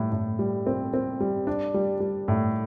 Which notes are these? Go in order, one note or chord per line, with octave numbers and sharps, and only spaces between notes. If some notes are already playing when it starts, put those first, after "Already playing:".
Already playing: A2 G3
A2
G3
C4
C4
G3
D4
G3
G3
A2